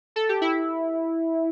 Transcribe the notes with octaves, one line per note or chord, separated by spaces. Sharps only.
A4
G4
E4